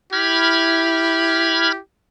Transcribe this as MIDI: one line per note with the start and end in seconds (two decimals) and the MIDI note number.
0.13 1.77 64
0.13 1.79 67
0.13 1.72 83
0.13 1.72 89
0.13 1.72 92